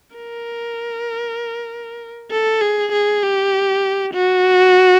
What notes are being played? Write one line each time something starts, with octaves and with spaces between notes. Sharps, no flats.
A#4
A4
G#4
G#4
G4
F#4